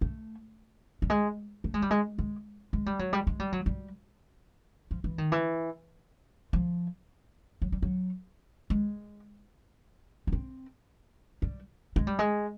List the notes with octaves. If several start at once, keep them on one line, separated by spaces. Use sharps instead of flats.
A3
G3
G#3
A3
G#3
G3
G#3
G#3
G#3
G3
F#3
G3
G#3
G3
F#3
G3
F3
E3
D#3
E3
F3
F#3
G3
F#3
G#3
B3
C4
G3
G#3
G3
G#3